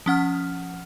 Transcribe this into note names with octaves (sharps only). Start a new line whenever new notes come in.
F3 C#4 F#5 F6